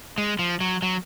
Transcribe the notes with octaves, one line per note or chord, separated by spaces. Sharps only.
G#3
F3
F#3
F#3